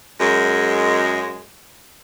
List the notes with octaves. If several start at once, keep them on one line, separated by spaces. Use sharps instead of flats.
F#2 G#3